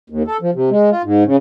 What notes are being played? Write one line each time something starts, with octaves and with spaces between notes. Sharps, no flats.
D#2
A4
F3
C3
G#3
F4
G#2
C#3